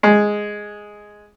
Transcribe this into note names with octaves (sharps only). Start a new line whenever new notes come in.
G#3